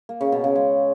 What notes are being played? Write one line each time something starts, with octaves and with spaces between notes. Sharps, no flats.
A#3
C#3
B2
C#3
G#3